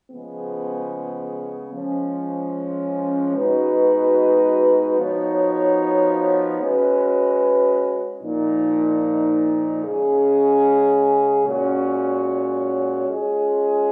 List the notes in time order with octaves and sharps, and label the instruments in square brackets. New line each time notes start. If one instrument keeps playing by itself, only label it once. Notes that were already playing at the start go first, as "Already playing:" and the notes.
[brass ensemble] C#3 F3 G#3 B3
F3 G#3 C#4
B2 G#3 D#4 F#4 B4
F3 B3 D#4 F#4 C#5
G#3 C#4 F#4 B4
A#2 F3 A#3 D#4
C#3 G#3 C#4 G#4
A#2 G#3 C#4 F#4 C#5
G#3 C#4 F4 G#4